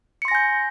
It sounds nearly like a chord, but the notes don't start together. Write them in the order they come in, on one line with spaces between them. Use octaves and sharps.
C#7 C6 A#6 G#5 G6